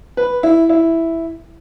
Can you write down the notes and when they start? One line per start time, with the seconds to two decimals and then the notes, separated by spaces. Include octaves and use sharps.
0.17 B4
0.43 E4
0.69 E4